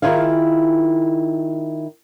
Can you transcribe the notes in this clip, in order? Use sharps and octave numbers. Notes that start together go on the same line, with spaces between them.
D#3 E4 F4 G#4 F5